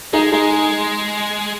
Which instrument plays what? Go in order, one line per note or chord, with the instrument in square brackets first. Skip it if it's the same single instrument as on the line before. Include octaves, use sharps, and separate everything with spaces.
[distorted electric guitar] G#3 [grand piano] D#4 G#4
[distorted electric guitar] G#3 [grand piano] D#4 G#4